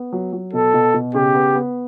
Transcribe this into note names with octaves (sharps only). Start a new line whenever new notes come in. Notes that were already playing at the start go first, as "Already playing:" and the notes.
Already playing: B3
F#3
F#3
B2 A4
B2
B2
C#3 G4
B3
B3